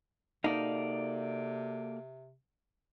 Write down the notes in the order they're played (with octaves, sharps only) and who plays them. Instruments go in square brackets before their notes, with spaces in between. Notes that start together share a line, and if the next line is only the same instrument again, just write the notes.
[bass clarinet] C3 [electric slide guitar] A#3 F#4 A4 [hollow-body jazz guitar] D#4 [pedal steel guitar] D5 F5